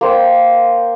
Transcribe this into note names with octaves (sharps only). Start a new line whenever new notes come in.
A#3 C5 G5